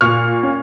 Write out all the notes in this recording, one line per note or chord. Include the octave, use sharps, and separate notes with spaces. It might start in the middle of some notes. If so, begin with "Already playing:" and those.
A#2 C#6 F6
C#4